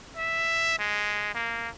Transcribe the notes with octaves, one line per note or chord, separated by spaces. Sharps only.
E5
G#3
A#3